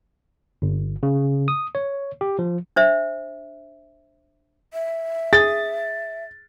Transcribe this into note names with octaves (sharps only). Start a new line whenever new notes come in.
G1
C#3
D#6
C#5
G4
F3
D4 C5 E5
E5
G#4 A6